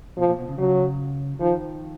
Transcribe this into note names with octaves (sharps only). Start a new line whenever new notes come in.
B2 F3
A#2
B2
C#3
C#3 F#3
D#3 F3